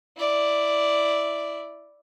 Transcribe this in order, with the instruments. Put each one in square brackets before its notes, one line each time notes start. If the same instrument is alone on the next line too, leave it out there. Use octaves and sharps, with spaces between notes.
[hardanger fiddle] E4 D5